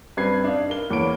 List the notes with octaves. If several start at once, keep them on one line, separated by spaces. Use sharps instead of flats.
G2 C4 B4 G#6 C7
D4 D#4 F5
A#4 G7
E2 A#3 C#5 B5 D7